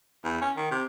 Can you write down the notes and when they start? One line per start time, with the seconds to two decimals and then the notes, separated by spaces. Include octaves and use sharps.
0.25 E2
0.42 C#4
0.56 D#3
0.71 C3